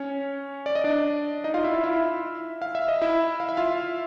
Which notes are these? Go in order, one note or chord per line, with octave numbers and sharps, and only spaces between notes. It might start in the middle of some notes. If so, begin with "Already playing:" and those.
Already playing: C#4 C#5
D5
D#5
D4 D5
D#4 D#5
F4 F5
E4 E5
F4 F5
E4 E5
F5
E5
D#5
E4 E5
F5
E5
F4 F5